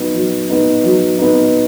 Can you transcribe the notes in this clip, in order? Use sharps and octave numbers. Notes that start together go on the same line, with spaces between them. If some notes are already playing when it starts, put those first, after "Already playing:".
Already playing: F#3 B3 D#4
F#3
B3 D#4
F#3
B3 D#4